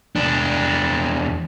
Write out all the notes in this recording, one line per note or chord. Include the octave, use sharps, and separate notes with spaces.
E2 D4